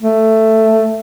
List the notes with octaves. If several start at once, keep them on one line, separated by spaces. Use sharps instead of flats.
A3